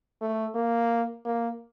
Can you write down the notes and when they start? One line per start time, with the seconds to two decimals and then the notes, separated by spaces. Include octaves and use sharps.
0.21 A3
0.55 A#3
1.25 A#3